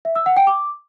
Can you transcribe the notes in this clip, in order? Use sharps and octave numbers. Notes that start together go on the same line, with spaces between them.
E5
E6
F#5
G5
D6